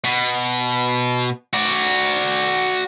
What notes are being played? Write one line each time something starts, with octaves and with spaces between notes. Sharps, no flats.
B2
F#4 D5